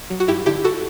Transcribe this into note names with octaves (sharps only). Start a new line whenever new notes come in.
F#3
F#4
G2 E4 G4
D3 E4 G4
F#4 A4